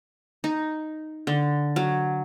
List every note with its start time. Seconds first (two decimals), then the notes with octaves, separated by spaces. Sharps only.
0.44 D#4
1.27 D3
1.76 F#3